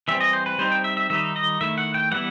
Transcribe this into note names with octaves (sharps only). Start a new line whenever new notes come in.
E3 G3 C4 E5
D#5
C5
B4
G3 C4 D#4 C5
G5
E5
E5
D#3 G3 D#4 E5
D#5
D#3 A3 E4 E5
F#5
G5
E3 G3 B3 E4 F#5